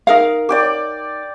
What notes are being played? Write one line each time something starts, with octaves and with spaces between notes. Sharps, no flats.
D#4 A#4 F5
D5 G5 D6